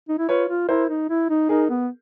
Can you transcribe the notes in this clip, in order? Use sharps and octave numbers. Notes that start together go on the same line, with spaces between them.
D#4
E4
F4 B4 C#5
F4
E4 A#4 C5
D#4
E4
D#4
D#4 G#4 A#4
B3